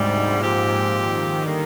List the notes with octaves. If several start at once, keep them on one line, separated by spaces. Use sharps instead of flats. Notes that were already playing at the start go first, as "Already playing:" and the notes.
Already playing: D2 G#2 C3 G3
A#2 F3 C4 G4
D#3
D3 G3 A#3